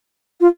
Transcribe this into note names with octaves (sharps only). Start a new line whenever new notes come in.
F4